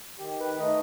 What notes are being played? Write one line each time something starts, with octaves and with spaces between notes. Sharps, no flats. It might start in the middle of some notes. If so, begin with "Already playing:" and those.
D#3 G4
B4
A3 D#4 D#5